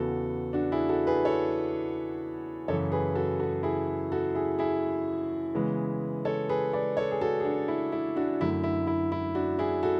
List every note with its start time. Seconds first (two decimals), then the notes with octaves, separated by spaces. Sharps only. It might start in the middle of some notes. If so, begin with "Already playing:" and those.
Already playing: E2 C#3 E3 B3 F#4 A4
0.53 D4 F#4
0.72 E4 G#4
0.89 F#4 A4
1.07 G#4 B4
1.25 A4 C#5
2.68 F#2 C#3 E3 A4 C#5
2.92 G#4 B4
3.15 F#4 A4
3.40 F#4 A4
3.63 E4 G#4
4.12 F#4 A4
4.35 E4 G#4
4.59 E4 G#4
5.55 C#3 E3 G#3 B3
6.25 A4 C#5
6.49 G#4 B4
6.73 B4 D5
6.97 A4 C#5
7.12 G#4
7.21 F#4 A4
7.40 G#4
7.45 D4 F#4
7.68 E4
7.92 E4
8.16 D4 F#4
8.41 F#2 D3 F#3 A3 E4
8.64 E4
8.87 E4
9.12 E4
9.35 D4 F#4
9.59 E4 G#4
9.83 F#4 A4